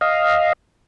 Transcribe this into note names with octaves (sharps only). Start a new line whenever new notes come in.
D#5 F5